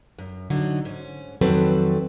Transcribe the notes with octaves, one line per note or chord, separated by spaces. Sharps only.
F#2
D3 F#3 D#4
G#2 C#4
F2 D#3 F#3 C4 A4 B4